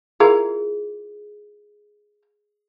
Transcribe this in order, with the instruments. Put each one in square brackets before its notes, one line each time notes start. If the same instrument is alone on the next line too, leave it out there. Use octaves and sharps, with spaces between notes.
[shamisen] E4 F4 A#4 [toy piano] G#4